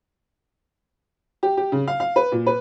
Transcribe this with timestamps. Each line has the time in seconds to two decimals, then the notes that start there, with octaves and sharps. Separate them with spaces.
1.43 G4
1.57 G4
1.72 C#3
1.88 F5
2.00 F5
2.16 B4
2.32 A#2
2.46 B4